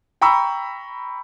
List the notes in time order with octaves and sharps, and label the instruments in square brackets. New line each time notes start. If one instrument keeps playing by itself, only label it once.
[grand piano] G5 A#5 B5 C#6 E6